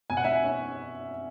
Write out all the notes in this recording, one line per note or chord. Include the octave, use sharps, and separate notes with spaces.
B2 G#5
F#5
E5 G#5
C#4